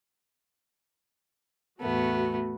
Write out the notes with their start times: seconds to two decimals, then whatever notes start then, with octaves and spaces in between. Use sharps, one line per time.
1.80 E2 A2 A3 B3 F#4